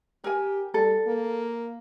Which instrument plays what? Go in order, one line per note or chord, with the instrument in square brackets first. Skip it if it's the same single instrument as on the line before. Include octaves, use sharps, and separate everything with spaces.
[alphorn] G4 [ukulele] A#4 G#5
[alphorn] G3 [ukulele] A4
[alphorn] A#3